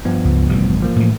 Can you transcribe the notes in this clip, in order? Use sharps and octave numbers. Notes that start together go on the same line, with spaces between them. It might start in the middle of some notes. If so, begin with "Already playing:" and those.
G2 F3 B3
C#2
A1 C3 G3
F3 A#3
A2 E3